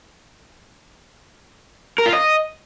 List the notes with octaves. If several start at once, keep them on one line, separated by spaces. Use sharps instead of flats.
A#4
F4
D#5